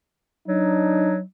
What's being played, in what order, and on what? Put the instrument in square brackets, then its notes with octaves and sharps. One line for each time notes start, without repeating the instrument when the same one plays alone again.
[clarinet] F#3 [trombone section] D4 D#4